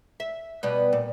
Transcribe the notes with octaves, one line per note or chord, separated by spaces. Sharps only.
E5
B2 G3 B3
A#2